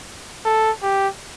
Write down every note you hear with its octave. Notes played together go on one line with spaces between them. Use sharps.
A4
G4